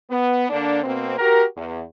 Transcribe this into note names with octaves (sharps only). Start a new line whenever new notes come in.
B3
D3 A#3 D4
B2 A#3 C4
F#4 G4 A#4
E2